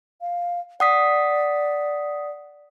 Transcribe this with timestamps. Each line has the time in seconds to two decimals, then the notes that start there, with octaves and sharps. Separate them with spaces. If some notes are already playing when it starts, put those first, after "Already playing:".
0.21 F5
0.80 D5 F#5 D#6 B6